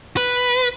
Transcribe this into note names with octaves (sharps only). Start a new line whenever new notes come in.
B4